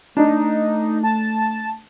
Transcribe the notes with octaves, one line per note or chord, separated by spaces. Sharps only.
A3 D4 D#4
A5